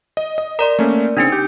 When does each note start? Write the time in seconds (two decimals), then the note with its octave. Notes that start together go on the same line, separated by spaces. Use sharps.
0.17 D#5
0.38 D#5
0.59 A#4 D5 A#5 C6
0.79 A3 A#3 C#4
1.17 C#3 C4 D4 D#4 C#7
1.32 G4 G6